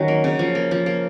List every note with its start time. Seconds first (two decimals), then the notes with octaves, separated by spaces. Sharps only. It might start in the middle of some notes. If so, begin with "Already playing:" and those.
Already playing: D#3 F#3 C#4 D#4
0.08 A#3
0.24 C#3
0.39 F3
0.55 A#3
0.71 F3
0.86 A#3